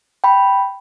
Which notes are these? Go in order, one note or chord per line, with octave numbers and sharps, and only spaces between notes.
G5 B5